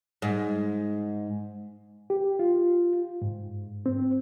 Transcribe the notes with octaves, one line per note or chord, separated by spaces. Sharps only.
G#2
G4
F4
G#2
C4